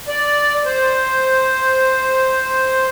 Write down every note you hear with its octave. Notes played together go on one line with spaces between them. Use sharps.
D5
C5